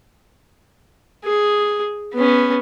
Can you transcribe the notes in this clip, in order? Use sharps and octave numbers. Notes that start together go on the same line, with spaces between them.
G#4
B3 C#4